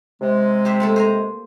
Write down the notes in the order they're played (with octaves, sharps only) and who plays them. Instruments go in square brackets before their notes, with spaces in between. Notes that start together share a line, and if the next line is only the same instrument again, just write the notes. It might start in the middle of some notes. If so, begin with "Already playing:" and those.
[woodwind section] C3 G#3
[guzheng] G4 C5 E5
A3 A#3 A4
C5 G#5 A#5